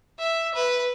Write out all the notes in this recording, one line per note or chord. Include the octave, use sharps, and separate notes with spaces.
E5
B4